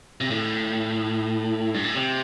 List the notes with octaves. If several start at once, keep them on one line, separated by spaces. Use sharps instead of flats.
C3
A2
G2
A2
C3